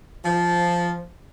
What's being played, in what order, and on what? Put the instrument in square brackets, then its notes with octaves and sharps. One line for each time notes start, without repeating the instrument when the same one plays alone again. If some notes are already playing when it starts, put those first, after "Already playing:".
[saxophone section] F3